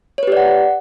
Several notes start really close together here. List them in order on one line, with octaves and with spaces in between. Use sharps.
C#5 B4 G4 D5 F#5